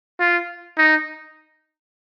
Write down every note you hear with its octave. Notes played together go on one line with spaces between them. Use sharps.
F4
D#4